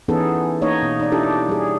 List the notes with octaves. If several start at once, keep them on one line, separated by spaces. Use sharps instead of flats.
E3 B3 C#4 D#4 G#4 A4
A#3 D#4 C#5 D#5
B2
D#4 D5
D4 E4 G4 A4
G3 G#4